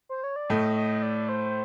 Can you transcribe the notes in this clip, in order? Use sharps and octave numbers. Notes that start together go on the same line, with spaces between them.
C5
C#5
D5
A2 A3 D#5
D#5
D5
C5